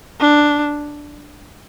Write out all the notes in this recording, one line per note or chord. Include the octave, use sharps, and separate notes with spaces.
D4